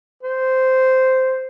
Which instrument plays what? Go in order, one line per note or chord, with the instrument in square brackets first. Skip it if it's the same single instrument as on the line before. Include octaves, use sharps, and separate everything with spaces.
[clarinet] C5